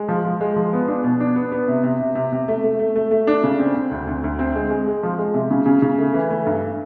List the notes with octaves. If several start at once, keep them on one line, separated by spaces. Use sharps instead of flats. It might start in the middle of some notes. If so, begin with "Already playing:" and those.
Already playing: G#3
F3
F3
G#3
F3
B3
D4
B2
D4
B3
B3
C3
C3
C3
C3
C3
A3
A3
A3
A3
A3
D4
C#3
C4
C4
D2
D2
D2
C4
G#3
G#3
G#3
F3
G#3
C3
C#3
C#3
C#3
A3
E3
A3
G2